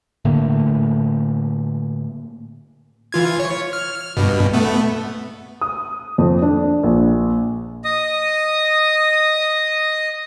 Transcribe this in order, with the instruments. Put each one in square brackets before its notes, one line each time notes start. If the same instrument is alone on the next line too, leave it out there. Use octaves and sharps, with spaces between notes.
[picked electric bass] A2 D3 A3 A#3
[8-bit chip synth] E3 F4 G#6
C#5
F6
G2 B2
A3 B3
[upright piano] D#6
F2
D4
A#1
[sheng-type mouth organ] D#5 D#6